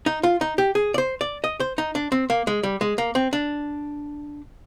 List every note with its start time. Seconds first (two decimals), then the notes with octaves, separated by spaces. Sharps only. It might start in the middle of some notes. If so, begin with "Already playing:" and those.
0.06 D#4
0.23 F4
0.41 D#4
0.58 G4
0.75 G#4
0.94 D5
0.98 C5
1.21 D5
1.44 D#5
1.60 C5
1.78 D#4
1.95 D4
2.12 C4
2.30 A#3
2.47 G#3
2.63 G3
2.81 G#3
2.98 A#3
3.15 C4
3.33 D4